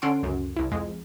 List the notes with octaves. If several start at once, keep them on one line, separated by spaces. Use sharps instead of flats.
D3 C#4 A4 F#5 C6 D7
C#2 F#2
C2 E4
F2 G#3